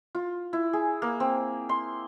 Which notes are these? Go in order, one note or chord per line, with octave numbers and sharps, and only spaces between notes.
F4
E4
G#4
A#3
C4
C6